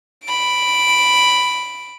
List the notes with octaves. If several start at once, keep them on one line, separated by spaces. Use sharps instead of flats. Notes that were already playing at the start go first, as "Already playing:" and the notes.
B5 D7